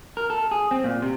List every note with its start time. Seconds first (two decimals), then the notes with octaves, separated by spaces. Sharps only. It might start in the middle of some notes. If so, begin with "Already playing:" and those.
0.17 A#4
0.30 A4
0.51 G#4
0.71 C4
0.84 A#2
1.02 C3